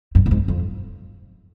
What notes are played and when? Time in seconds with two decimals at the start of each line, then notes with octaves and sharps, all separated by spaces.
0.15 G2
0.26 A#2
0.31 G#2
0.48 F2